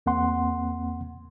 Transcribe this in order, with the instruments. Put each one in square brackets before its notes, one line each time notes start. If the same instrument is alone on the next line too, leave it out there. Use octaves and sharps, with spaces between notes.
[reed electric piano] E2 A#3 C4 F#5 C6